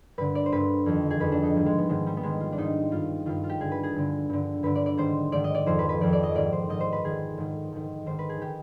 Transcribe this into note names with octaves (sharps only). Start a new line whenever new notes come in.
G2 D3 B4
D5
C5
G2 D3 B4
F2 D#3
G#4
F2 D#3 B4
D4
D#4
G#2 D#3 G3
G#3
B3
G#2 D#3 G#3
G3
B3
G#2 D#3 G#3
F4
D4
G#2 D#3 D#4
G2 D#3 F4
G2 D#3 F4
F4
G4
G2 D3 G#4
B4
G#4
G2 D3
G2 D3
G2 D3 B4
D5
D5
G#2 D#3 C5
G#2 D#3 D5
D#5
D5
F2 D#3 C5
B4
B4
F2 D#3 D5
D5
D#5
G#2 D#3 D5
C5
G#2 D#3 D#5
C5
B4
G#2 D#3 G#4
G#2 D#3
G#2 D#3
G#2 D#3 C5
B4
G#4
D#3 G4